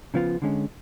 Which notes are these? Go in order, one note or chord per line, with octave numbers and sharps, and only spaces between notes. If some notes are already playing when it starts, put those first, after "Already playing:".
C#3 F3 B3 F4
D3 G#3 C#4